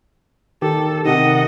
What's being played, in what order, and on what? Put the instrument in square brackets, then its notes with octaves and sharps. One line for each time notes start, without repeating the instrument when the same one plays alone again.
[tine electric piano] D#3 G4 [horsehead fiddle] A4
[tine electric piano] C3 D#3 [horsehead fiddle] D#5 F#5